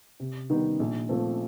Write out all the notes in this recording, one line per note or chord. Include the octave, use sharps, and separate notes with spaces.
C3
D#3 G3 B3 D#4
A#1
A#2 F3 A3 C4